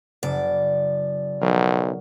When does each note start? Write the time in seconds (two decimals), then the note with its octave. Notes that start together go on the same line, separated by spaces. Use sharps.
0.23 F#1 D5
1.41 B1 F#3 A#4